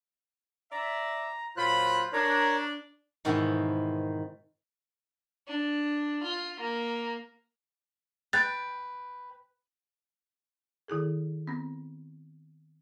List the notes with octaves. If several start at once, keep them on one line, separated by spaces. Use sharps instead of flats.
D5 E5 A#5
A#2 F#3 F4 C5 B5 F#6
D4 A#4 C#5 A#5
G#2 B2 D#3 E3 C4 E4
D4
F4
A#3
B4 G5 F#6 A6
D#3 E4 G#4 A4
B3 C4